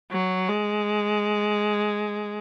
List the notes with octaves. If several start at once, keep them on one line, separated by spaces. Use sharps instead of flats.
F#3
G#3